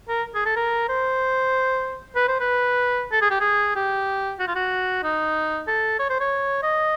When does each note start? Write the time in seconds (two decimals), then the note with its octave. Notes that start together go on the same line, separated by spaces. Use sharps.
0.09 A#4
0.35 G#4
0.46 A4
0.56 A#4
0.89 C5
2.16 B4
2.28 C5
2.40 B4
3.12 A4
3.22 G#4
3.31 G4
3.41 G#4
3.76 G4
4.39 F#4
4.48 F4
4.56 F#4
5.04 D#4
5.68 A4
5.99 C#5
6.10 C5
6.20 C#5
6.63 D#5